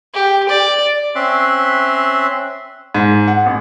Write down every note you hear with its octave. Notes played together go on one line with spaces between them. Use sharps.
G4
D5
C4 C#4 E5 C6 F#6
G#2
F#5
A1